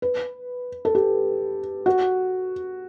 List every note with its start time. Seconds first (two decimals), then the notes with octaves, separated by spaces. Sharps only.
0.02 B4
0.85 A4
0.95 G4
1.86 F#4